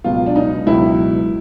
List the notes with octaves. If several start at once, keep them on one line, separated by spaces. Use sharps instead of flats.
C#2 B2 F#3 F4
D4
D#4
C#2 B2 F#3 E4